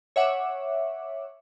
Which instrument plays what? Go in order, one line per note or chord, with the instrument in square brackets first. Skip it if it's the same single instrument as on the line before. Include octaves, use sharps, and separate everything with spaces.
[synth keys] C#5 E5 F#5 D6